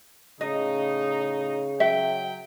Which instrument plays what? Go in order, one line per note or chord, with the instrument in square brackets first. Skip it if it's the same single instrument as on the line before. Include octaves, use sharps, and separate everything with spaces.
[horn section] A2 D#4 [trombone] C#3 [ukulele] D#5
[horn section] F#3 G5 [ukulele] E5